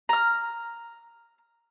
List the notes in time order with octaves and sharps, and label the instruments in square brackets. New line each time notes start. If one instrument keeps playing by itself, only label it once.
[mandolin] A#5 F6